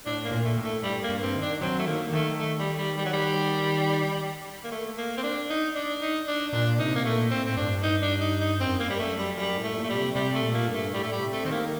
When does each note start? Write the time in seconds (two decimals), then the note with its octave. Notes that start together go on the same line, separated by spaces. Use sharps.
0.06 A2 D4
0.25 A#3
0.31 A#2
0.44 A3
0.57 A2
0.64 A3
0.83 G2 G3
1.03 A#3
1.09 G2
1.22 C4
1.35 D#3
1.42 D4
1.61 F#3 C4
1.79 A3
1.87 D#3 A#3
2.13 D#3 A3
2.39 A3
2.58 G3
2.78 G3
2.97 G3
3.05 F#3
3.13 G3
4.64 A#3
4.72 A3
4.98 A#3
5.17 C4
5.23 D4
5.50 D#4
5.75 D4
6.02 D#4
6.27 D4
6.53 A#2 D4
6.78 C3 D#4
6.95 A#3
7.05 A#2 A3
7.30 A2 C4
7.45 C4
7.57 G2 D4
7.83 D#4
8.02 D4
8.21 D#4
8.40 D#4
8.60 F#2 C4
8.80 A#3
8.88 F#2 G3
8.99 A3
9.18 G3
9.37 F#2 G3
9.57 A2
9.64 A3
9.76 A#2
9.84 A3
9.90 G3
9.95 C3
10.15 C3 G3
10.35 A3
10.41 A#2
10.54 A#3
10.68 G2
10.74 A3
10.93 A2 G3
11.03 A3
11.12 G3
11.19 C3
11.33 A3
11.45 D#3 C4
11.51 A#3